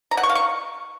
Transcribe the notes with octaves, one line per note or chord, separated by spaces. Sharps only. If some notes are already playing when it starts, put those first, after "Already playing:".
A#5
F#5
C#6
F5
C#6